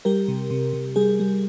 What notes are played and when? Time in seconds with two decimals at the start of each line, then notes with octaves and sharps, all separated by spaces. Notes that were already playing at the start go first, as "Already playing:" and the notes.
0.05 G3 G4 A#4
0.28 C3
0.50 C3
0.73 C3
0.96 G3 G#4
1.20 G3